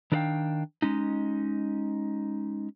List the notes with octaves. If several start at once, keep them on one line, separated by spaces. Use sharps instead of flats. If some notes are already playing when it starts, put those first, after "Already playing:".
D#3 D4 A#4 D5 F5 G5
G#3 C#4 D#4